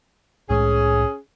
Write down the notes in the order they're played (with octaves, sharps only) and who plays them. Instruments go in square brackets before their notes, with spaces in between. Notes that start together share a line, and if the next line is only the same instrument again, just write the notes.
[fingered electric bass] C2 A2 G#3 [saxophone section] C#4 G#4